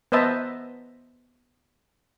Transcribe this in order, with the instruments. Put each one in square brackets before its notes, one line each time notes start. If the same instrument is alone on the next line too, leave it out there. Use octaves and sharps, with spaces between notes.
[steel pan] B3 B4 C5 D#5 E5 A5